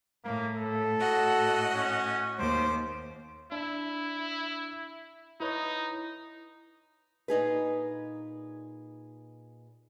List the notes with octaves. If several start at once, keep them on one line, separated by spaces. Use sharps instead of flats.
A2 A#3
A4
A2 F#4 D#5
C#4
D#2 C5 D6
D4 E4 E5
D#4 E4 B4 C#5
A#2 D#4 G#4 B4